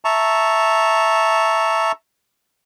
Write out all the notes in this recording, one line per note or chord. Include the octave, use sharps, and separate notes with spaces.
E5 A5 A#5 C#6